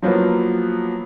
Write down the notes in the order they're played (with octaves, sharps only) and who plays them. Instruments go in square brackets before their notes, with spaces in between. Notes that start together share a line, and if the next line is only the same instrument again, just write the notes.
[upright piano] F3 F#3 A#3 B3 E4